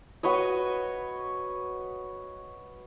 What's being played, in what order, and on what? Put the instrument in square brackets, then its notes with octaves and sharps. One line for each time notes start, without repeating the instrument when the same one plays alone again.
[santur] F#4 B4 C#5 D#5